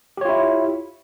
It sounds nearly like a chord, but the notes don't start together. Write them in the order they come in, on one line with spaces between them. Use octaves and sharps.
G4 C#5 F4 E4